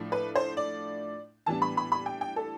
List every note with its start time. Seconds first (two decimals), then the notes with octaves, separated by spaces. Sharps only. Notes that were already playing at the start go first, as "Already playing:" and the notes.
Already playing: A2 F3 A3 D4
0.12 B4
0.35 C5
0.57 D5
1.46 A2 E3 G3 B3 D4 A5
1.62 B5
1.77 B5
1.92 B5
2.06 G5
2.21 G5
2.36 A4